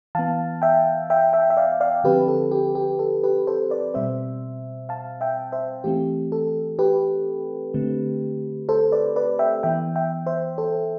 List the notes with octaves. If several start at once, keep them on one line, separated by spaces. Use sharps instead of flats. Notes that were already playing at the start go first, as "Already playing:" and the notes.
E3 B3 F5 A5
E5 G5
E5 G5
E5 G5
E5
D5 F5
D5 F5
D3 F3 C4 G4 B4
A4
G4
G4
A4
G4 B4
A4 C5
B4 D5
B2 G3 C4 C5 E5
F5 A5
E5 G5
C5 E5
E3 A3 C4 G4
A4
G4 B4
D3 A3 C4
A4 C5
B4 D5
B4 D5
E5 G5
E3 B3 E5 G5
E5 G5
C5 E5
A4 C5